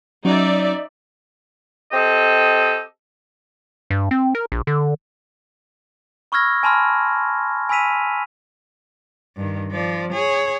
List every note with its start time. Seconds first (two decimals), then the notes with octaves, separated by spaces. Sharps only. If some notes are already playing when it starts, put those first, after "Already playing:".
0.25 F#3 C#4 D#4 D5 E5
1.92 C4 G4 A4 D#5
3.90 G2
4.11 C4
4.35 A#4
4.52 A#1
4.67 D3
6.32 B5 C#6 E6 F6 G#6 A#6
6.63 G#5 A5 B5 C6 F6
7.69 G#5 B5 E6 B6 D#7 F7
9.37 G2 D#3
9.72 F3 D5
10.12 G#4 C#5